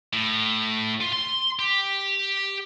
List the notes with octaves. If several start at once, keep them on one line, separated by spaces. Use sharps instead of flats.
A2
F4
C6
G4